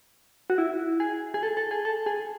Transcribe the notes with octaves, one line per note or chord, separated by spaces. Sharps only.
F#4
E4
G#4
G#4
A4
A4
G#4
A4
G#4